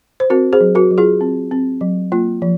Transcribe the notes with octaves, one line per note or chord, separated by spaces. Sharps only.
C5
C4 F#4 A#4
G#4 C5
F#3
F#4 A#4
F#3
F4 G#4
C4
C4
F#3
A#3 F4
F3